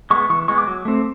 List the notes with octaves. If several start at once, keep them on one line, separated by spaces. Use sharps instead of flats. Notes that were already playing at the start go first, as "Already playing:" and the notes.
G#3 B3 C#6
E3 C#6
G#3 B3 C#6
D6
F#3
A3 C4